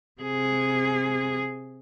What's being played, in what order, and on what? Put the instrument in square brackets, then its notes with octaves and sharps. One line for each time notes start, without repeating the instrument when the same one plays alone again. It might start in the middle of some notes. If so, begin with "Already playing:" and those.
[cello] C3 G#4